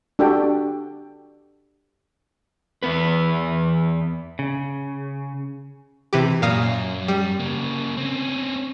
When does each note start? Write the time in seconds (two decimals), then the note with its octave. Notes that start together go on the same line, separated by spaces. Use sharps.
0.19 D4 F#4 G4 A4 G5
2.83 E2 B3 B4
4.39 C#3
6.13 C3 E3 G4
6.42 F#2 A#2 F5 D#6
7.08 G3
7.40 C#3 A#3
7.97 C4 C#4